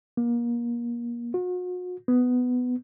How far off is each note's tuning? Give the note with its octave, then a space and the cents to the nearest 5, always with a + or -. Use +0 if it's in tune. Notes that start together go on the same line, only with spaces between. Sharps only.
A#3 +30
F#4 -40
B3 +10